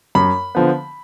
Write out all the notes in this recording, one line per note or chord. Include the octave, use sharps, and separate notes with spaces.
F#2 B5
D3 F3 B3